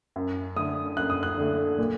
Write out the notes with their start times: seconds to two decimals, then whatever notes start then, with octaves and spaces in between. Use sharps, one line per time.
0.16 F#2
0.56 D3 A3 D#6
0.97 F#2 F#6
1.10 D#6
1.23 F#6
1.38 D3 A3
1.78 A#2